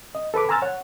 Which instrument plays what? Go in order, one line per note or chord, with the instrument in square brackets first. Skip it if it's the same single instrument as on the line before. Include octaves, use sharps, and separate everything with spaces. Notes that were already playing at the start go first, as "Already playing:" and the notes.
[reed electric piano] D#5
A4 B4 B5 D6
G#5 A#5 C6 E6 F6 A6
C#5 F#5